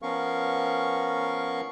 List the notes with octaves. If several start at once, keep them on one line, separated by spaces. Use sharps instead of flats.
F3 B3 C#4 A#4 F5 C#6